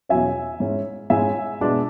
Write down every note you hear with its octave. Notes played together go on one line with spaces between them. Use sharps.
E2 B2 F#3 C#4 E5 G#5
G#2 G#3 C#4 E4
G#2 G#3 C#4 E4 E5 G#5
B2 G#3 B3 D4